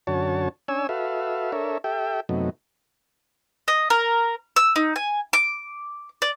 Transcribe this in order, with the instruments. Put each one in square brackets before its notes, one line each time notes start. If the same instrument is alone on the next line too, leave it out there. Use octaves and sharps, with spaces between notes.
[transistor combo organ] F#2 D3 C#4 F#4 C#5 A5
C#4 D4 C#5 G#5 E6
F#4 A4 B4 E5 F5
D4 A4 A#4 C#5 E5
G4 A4 E5 G5
F#2 C3 F#3 A3 B3 D#4
[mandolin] D#5
A#4
E6
D#4
G#5
D6
D5